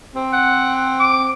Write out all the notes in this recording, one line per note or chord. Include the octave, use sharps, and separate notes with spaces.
C4
F#5
D6